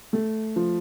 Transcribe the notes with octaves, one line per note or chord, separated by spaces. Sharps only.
A3
F3